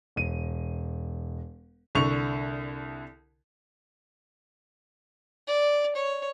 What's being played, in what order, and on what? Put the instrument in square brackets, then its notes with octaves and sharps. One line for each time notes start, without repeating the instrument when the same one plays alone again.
[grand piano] E1 D#7
[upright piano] C2 D3 C#6 F7
[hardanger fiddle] D5
C#5